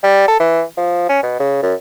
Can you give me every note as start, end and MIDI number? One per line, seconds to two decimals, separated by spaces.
0.04 0.27 55
0.28 0.38 69
0.40 0.62 52
0.77 1.07 53
1.09 1.20 61
1.23 1.35 47
1.40 1.60 49
1.62 1.74 42